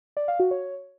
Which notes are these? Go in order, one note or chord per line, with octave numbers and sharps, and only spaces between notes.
D5
F5
F#4
C#5